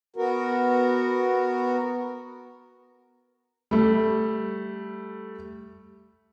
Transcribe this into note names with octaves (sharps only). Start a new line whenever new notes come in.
B3 F#4 A#4
G3 A3